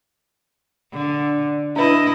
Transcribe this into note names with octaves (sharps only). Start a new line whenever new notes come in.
D3
D4 E4 B4 D#5